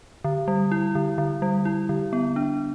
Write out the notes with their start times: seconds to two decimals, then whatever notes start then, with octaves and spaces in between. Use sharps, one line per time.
0.25 D3
0.48 G3
0.72 E4
0.95 D3
1.18 D3
1.42 G3
1.65 E4
1.89 D3
2.13 B3
2.36 D4